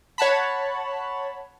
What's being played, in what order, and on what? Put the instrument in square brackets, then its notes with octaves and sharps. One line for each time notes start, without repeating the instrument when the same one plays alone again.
[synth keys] C#5 F#5 A5 B5